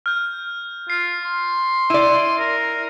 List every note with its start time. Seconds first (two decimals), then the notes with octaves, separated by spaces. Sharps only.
0.06 F6 G6
0.90 F4 C7
1.25 C6
1.90 E4 D5 D#7
2.39 A#4